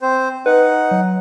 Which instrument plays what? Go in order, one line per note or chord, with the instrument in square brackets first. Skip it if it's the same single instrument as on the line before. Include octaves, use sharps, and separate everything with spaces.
[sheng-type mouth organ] C4 C5
[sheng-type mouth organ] D#4 F#5 [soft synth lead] B4
[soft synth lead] F#3